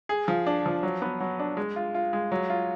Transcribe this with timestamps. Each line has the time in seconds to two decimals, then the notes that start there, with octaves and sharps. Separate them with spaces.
0.09 G#4
0.28 F3
0.47 D4
0.66 F3
0.83 F#3
1.02 B3
1.20 F#3
1.39 D4
1.57 G#3
1.76 F4
1.94 F4
2.13 G#3
2.32 F#3
2.50 F4